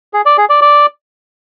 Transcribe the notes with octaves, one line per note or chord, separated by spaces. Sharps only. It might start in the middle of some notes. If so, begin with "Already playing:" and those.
G#4
D5
G#4
D5
D5